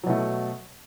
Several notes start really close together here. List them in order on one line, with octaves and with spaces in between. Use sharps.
F#3 B2 A3